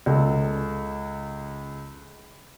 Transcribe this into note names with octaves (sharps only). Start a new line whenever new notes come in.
C#2 A4